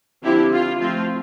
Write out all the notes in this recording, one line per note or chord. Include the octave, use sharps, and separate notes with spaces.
D3 F3 C4 E4 G4
F4
F3 A3 C4 F4